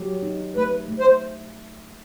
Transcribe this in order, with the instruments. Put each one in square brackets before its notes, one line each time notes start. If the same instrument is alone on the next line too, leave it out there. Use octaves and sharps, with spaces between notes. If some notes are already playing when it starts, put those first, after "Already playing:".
Already playing: [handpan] F#3 G4
D#4
[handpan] A3 [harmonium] B4
[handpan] A3
[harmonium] C5